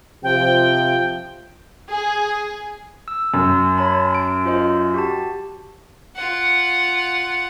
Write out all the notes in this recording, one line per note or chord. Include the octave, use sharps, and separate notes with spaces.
C3 F3 G5
G#4
E6
F#2
C#5 A5 B5
D7
F4 C5 D#5
F#4 G4 A5
F4 F#5